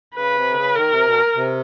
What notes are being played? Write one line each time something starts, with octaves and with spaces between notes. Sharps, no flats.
C#3 B4
C3
D3
C#3
D#3 A#4
C3
B2
C3